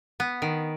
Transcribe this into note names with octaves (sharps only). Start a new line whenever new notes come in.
B3
D#3